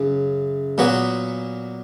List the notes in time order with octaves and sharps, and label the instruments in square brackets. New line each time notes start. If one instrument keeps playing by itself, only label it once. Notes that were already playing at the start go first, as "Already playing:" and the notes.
Already playing: [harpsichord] F#2 C#3
A#2 F#3 B3 F#4